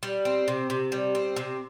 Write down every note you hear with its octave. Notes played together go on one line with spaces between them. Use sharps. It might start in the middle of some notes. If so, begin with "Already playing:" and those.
G3
C4
C3
C3
G3
C4
C3